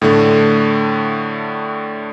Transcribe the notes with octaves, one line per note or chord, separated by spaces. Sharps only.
A2 D3 A3